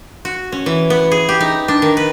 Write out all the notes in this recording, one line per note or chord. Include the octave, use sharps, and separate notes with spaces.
F#4
C#4
E3
B3
G#4
G4
D#4
D4
D#3
B4